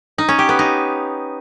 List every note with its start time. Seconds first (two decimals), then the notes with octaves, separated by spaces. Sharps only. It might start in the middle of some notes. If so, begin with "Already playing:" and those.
0.18 D#4
0.28 C#4
0.39 G4
0.49 B3
0.59 D#4